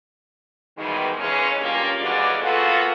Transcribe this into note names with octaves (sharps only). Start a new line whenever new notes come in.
G#2 B2 D#3 E3 G3 G#3
A#2 C#3 E3 G#3 C#4
G2 A#3 C#4 F4 G4
F2 C#3 E3 G#3 F#4 D5
A#3 B3 F4 F#4 G#4 A4